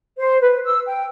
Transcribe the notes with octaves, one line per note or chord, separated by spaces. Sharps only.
C5
B4
E6
G5